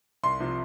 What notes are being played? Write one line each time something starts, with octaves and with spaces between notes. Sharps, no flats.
C2 C6
C3 F3